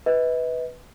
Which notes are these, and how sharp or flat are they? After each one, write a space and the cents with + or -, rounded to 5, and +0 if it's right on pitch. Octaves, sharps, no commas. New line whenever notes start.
B4 +0 D#5 +40